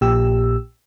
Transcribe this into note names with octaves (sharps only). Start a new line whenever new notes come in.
A#1 A#2 G4 E6